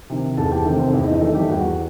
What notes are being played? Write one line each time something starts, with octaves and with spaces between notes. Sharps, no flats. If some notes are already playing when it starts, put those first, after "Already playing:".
C3 D#3
E2 A4 A5
G4 G5
C3 D#3 A3 A4
C4 C5
E2 E4 E5
D#4 D#5
D#3 A3 A4
G3 G4
E2 F#4